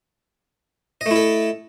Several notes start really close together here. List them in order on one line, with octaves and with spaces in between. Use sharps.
D#5 A3 E4 A4